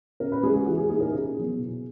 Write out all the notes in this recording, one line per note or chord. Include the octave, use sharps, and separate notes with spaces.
C#3 A#4
B4
G#3 C#4 E4 G#4
F#4
E3 G#4
G#4
A#3 D#4 G#4
A#4
C#3 G#4
F#3 B3 E4
B2